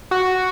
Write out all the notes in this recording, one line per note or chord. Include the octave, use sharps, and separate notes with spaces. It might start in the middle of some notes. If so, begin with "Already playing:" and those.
F#4